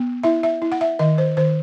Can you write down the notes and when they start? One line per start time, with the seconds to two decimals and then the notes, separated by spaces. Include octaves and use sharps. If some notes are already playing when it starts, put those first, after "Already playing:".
Already playing: B3
0.23 E4 E5
0.43 E5
0.62 E4
0.72 F#5
0.81 E5
0.99 D#3 D#5
1.18 C5
1.37 D#3 C5